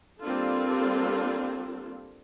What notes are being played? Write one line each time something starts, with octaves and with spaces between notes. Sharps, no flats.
G3 A#3 C4 D4 F4 A4